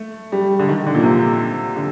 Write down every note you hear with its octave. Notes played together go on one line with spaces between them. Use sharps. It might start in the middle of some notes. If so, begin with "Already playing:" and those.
Already playing: A3
G3
D3
D#3
D3
A#2
C3
D3